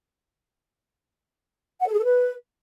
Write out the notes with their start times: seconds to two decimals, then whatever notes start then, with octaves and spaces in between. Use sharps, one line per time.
1.81 F#5
1.87 A4
1.92 G#4
1.98 A4
2.04 B4